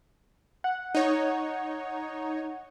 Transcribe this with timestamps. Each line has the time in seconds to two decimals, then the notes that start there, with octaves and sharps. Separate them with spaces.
0.64 F#5
0.95 D#4 C#5